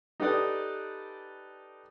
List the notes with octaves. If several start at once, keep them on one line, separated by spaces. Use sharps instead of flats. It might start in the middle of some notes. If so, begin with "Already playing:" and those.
D#4 G4 A4 B4 D5 D#6